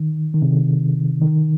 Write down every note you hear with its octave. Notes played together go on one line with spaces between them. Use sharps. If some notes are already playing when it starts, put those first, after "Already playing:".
Already playing: D#3
D#3
C3
D#3